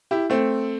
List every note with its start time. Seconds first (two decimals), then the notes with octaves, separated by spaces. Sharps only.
0.11 E4 G4
0.30 A3 C4